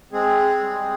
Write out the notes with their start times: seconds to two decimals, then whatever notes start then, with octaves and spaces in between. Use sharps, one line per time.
0.12 G#3 C4 G#4
0.59 G3